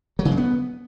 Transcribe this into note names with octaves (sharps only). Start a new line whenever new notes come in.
F#3
C#3
G#3
B3